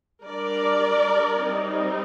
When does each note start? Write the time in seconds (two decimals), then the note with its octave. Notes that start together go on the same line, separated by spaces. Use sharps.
0.23 G3 D4 A#4 D5
1.36 G3 C4 D#4